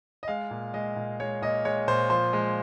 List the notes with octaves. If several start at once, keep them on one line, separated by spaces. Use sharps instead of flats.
D#5
G#3 F5
A#2
G#3 D#5
A#2
G#3 C#5
A#2 D#5
G#3 C#5
A#2 C5
F3 C5
G#3